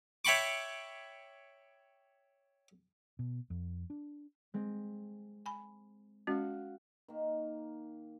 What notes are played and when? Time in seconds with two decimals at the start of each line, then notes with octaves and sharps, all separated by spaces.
0.25 C#5 E5 G5 B5 C#6 D6
3.19 B2
3.50 F2
3.90 D4
4.54 G#3 C4
5.46 G#5 B5
6.27 G#3 C#4 F#4 F5
7.08 D#3 A#3